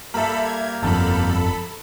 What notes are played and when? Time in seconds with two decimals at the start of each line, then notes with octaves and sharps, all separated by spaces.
0.14 G3 A#3 A4 E5 F5 A#5 B5
0.45 G#6
0.83 G1 F2 A4 A#5 B5